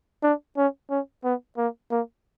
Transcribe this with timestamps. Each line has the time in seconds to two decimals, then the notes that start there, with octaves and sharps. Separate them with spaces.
0.23 D4
0.57 C#4
0.90 C#4
1.24 B3
1.58 A#3
1.91 A#3